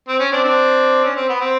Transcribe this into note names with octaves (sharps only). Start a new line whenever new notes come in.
C4
C#4
C4 D4
C4 D4
C#4
C4
B3
C4